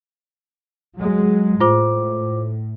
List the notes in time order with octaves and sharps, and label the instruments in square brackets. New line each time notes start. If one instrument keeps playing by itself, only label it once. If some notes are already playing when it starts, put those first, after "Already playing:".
[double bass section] F#3 G#3
[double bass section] A2 [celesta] F4 C5 D6